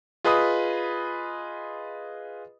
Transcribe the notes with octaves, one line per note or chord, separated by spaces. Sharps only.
F4 G#4 B4 D#5 B5 D#6